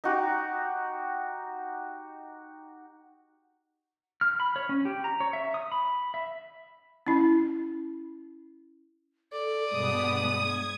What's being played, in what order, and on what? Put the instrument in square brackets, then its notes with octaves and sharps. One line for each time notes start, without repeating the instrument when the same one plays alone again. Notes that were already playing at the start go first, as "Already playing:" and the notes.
[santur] D#4 F#4 G4
[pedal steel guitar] F6
B5
C#5
C#4
G4
A#5
C#5
E5
D#6
B5
E5
[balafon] C#4 E4
[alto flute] A4 [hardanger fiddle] D5
[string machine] G2 B2 B3 [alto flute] G#3 [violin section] D#6
[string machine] G#6